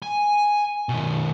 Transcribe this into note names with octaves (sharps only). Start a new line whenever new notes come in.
G#5
B2 D#3